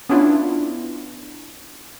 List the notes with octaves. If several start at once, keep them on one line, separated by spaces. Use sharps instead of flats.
B3 C#4 D4 E4 F4